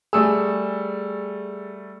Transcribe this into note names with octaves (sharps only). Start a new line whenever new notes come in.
G3 A3 G#4 E6